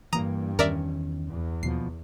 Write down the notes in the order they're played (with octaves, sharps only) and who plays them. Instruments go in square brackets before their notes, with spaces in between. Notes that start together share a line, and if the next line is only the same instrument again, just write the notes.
[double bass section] G2 [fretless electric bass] E3 A#3 [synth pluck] A#5 D#6
[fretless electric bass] E2 D#3 C#4 [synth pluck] A#4 D5 E5
[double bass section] E2
[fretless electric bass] D#2 B2 F3 [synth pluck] C7